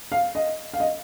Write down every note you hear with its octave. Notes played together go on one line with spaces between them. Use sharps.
F5
D#5
F5
D#5